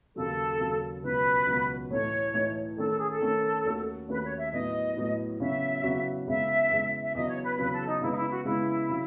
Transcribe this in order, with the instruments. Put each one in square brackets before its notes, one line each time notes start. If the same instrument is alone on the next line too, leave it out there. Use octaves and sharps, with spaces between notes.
[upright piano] D#2 C#3 F#3 [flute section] A4
[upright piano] D#2 C#3 F#3
[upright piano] C#2 B2 F#3 B3 F#4 [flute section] B4
[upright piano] C#2 B2 F#3 B3 F#4
[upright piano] A2 E3 A3 D#4 [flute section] C#5
[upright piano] A2 E3 A3 D#4
[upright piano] D#3 A3 C#4 [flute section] A4
[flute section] A4
G#4
A4
[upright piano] D#3 A3 C#4
D#2 D#3 A3 C#4 F#4
[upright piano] D#2 D#3 A3 C#4 F#4 [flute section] B4
[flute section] C#5
E5
[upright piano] A2 F#3 B3 D#4 [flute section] D#5
[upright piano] A2 F#3 B3 D#4
[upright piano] E2 C#3 F#3 C#4 F#4 [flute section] E5
[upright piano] E2 C#3 F#3 C#4 F#4
[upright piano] E2 C#3 G#3 [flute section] E5
[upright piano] E2 C#3 G#3
[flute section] E5
[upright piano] E2 C#3 F#3 [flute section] D#5
[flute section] C#5
B4
[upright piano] E2 C#3 F#3 [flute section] B4
[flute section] A4
D#4
[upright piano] C#3 G#3 B3 [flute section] E4
[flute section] D#4
E4
F#4
[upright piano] C#3 G#3 B3 [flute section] E4
[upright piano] C#3 F#3